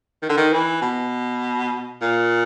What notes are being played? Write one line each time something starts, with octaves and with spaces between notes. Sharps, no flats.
D#3
D3
D#3
E3
B2
A#2